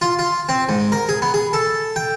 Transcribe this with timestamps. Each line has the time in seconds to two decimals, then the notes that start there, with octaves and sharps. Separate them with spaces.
0.01 F4
0.19 F4
0.49 C4
0.69 G#2
0.92 A#4
1.09 G#4
1.22 B3
1.34 G#4
1.53 A4
1.96 G5